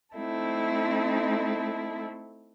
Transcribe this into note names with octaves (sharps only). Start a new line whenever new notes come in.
A3 C4 D#4 E4 A4